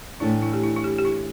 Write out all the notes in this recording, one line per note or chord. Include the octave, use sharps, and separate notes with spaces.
A2 E3 A3 D4 E4
E4
G4
E4
E4
G4
G4
E4